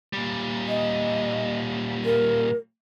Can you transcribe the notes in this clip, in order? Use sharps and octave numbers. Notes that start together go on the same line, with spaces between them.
A#2 G3
D#5
A#4